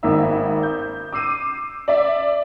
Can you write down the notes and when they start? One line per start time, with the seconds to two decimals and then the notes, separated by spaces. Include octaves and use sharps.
0.03 G#1 A#3 D#4 E5 E6
0.63 G6
1.12 D6 E6 C7 D#7
1.88 D5 E5